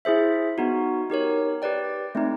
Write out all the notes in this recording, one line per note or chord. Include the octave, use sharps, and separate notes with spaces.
E4 G#4 C5 E5
B3 D#4 F#4
D#4 G4 A#4 C#5
G4 B4 D5 G5
A3 C4 D#4